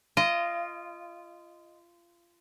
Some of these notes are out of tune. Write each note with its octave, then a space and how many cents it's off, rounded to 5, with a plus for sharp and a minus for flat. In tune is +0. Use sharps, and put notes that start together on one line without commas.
F4 -25 D#5 +0